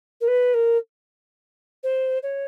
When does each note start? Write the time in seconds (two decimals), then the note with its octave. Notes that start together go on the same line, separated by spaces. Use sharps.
0.21 A#4
0.28 B4
0.54 A#4
1.83 C5
2.23 C#5